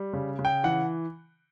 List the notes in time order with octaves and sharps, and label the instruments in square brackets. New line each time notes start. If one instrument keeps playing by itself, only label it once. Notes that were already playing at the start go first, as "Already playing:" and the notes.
Already playing: [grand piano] G3
C#3
C#3
G5
E3 F#5